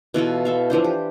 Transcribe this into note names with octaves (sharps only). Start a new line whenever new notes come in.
B2 E3 F4 A4
A4 E5 F5
E3 F3 D4 C5
G4